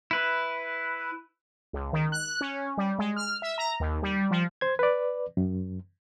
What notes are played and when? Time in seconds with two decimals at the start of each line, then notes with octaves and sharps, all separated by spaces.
0.11 E4 B4
1.73 C#2
1.93 D#3
2.12 F#6
2.41 C#4
2.77 G3
2.99 G#3
3.16 F6
3.42 E5
3.58 A#5
3.80 D#2
4.03 G3
4.31 F3
4.61 C5 G#6
4.79 B4 D5
5.37 F#2